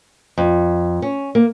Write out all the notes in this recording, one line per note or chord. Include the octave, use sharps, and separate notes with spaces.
F2
C#4
A#3